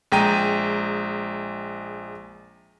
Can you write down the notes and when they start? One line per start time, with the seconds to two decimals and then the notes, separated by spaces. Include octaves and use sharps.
0.12 A#1 G#3 G5 A#5 D#7